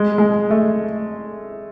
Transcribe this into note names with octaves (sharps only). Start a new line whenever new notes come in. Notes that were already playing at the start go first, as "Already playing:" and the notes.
Already playing: G#3
G#3
A3